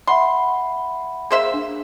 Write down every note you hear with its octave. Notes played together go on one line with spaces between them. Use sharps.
E5 F#5 B5 C6
A#3 G#4 C5 E5
D4